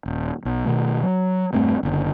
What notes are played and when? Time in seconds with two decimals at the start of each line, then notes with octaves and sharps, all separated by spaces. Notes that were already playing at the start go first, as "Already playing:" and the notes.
0.06 D#1
0.45 B1
0.65 B2 D#3 A3
1.03 F#3
1.53 E1 G2 A3 C4
1.83 F#1 B2 D3